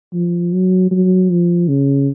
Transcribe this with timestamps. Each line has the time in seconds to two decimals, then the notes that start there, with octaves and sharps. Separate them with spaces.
0.13 F3
0.53 F#3
0.91 F#3
1.30 F3
1.68 C#3